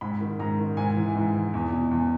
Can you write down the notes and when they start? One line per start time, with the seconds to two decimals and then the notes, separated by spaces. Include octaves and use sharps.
0.01 G#2 B5
0.20 D#3
0.39 G#2 A#5
0.59 D#3
0.77 G#2 G#5
0.96 E3
1.15 G#2
1.35 E3
1.54 E2
1.72 B2
1.91 E2